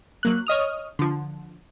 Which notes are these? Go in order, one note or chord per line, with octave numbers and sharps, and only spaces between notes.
F#3 A#3 F#6
C#5 D#5 D#6 F6
D3 F3